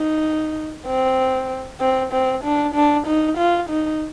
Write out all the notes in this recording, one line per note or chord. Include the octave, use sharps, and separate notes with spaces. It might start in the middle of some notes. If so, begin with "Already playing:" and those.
Already playing: D#4
C4
C4
C4
D4
D4
D#4
F4
D#4